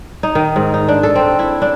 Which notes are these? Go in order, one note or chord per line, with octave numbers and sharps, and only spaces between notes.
D#4
D#3
G#2
D#4
D4
A4
C4
E4
D4